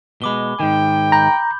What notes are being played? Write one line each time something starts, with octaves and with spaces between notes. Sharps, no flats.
B2 G#3 B5 D6 G7
G#2 D#3 G5
A#5 B5 G6